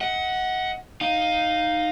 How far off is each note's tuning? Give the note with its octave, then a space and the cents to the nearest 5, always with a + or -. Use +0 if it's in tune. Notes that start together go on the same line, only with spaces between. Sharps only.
D#5 +40 F#5 +0
D#4 +0 F5 +10